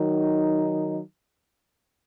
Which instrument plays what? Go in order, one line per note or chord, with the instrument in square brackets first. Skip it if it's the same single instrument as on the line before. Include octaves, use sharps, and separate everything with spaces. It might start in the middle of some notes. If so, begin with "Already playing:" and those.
Already playing: [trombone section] D#3 F#3 D#4